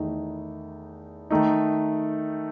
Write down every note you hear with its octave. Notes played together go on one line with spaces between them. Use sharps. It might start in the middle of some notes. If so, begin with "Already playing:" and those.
Already playing: E2 D#3 A3 D#4
D#3 A3 D#4